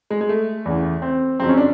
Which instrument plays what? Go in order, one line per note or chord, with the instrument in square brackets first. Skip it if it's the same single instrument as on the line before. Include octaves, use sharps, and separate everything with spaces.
[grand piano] G#3
G#3
A3
E2 C#3 E3
C4
F2 C#3 F#3 C4
C#4
D4